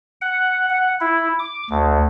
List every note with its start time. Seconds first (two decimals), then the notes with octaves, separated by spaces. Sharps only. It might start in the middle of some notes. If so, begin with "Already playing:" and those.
0.21 F#5
0.69 F#5
1.01 E4
1.39 D6
1.70 D2